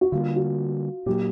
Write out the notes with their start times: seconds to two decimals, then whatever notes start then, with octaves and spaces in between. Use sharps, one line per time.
0.01 F#4
0.12 D3 G3 A#3 F4
0.36 F#4
1.06 A#2 F#3 A#3 G4